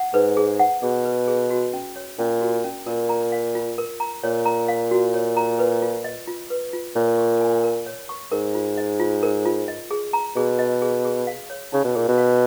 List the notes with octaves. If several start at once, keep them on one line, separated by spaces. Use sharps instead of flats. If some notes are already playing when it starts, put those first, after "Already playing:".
Already playing: F#5
G#2 B4
G#4
F#5
B2 G#4
B4
G#4
F#4
C#4
C#5
A#2 C#4
F#4
C#4
A#2 A#4
A#5
F5
F4
A#4
A#5
A#2 C#5
A#5
F5
F#4
C#5
A#5
B4
F4
D#5
F4
B4
F4
A#2 C#5
C#6
G#5
A#4
C#5
C#6
G#2 A#4
F4
D#5
F4
A#4
F4
D#5
G#4
A#5
B2 G#4
D#5
G#4
G#4
F5
C#5
C#3 D#4
B2
A#2 G#4
B2
F5